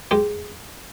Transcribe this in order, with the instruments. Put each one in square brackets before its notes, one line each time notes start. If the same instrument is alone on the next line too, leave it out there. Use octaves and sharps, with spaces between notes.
[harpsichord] G#3 G4